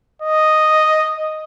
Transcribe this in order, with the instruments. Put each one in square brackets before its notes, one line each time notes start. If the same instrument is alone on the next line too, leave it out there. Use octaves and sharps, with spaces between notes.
[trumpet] D#5